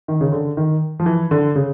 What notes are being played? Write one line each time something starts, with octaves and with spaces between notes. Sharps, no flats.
D#3
C#3
D3
D#3
F3
E3
D3
C#3